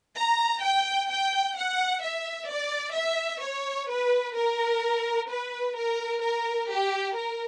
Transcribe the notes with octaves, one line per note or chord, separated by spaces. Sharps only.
A#5
G5
G5
F#5
E5
D5
E5
C#5
B4
A#4
B4
A#4
A#4
G4
A#4